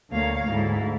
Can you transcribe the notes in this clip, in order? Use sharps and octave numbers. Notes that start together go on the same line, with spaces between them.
D2 A#3 C#5 F5
D2 G#2 E4